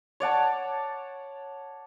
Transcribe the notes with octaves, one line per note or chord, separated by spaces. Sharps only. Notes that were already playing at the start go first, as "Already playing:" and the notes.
C#5 D5 F#5 A5